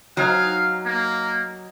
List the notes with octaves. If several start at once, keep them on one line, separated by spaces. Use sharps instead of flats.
F#3 D#4 F5 G#5
A#3